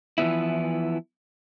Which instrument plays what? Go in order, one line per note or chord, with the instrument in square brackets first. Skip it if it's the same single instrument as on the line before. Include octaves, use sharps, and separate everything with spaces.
[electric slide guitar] E3 F3 B3 E4